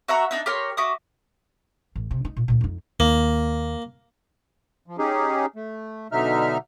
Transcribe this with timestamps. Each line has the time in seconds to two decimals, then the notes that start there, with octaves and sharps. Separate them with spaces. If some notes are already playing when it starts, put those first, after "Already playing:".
0.08 F#4 E5 F#5 A#5
0.31 D4 D#4 E5
0.46 G4 A#4 C#5 C6
0.77 F#4 E5 D6 D#6
1.95 A1
2.11 C3
2.25 D#4
2.36 A#2
2.48 D2 A#2
2.61 F2 D#4
3.00 D#2 A#3
4.86 F3
4.98 C#4 D#4 G4 G#4
5.56 A3
6.12 B2 D3 F#3 D#4 E5 F6